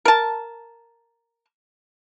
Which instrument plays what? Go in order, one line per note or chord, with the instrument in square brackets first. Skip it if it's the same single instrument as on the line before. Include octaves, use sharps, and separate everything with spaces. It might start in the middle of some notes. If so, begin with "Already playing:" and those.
[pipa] A#4 A5